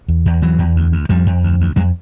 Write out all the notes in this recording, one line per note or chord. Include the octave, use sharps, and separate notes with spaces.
E2
E2
E2 E3 F#3
E2
D2
D2
F2 F3 G3
F2
D2
D2
F2 F#3 G#3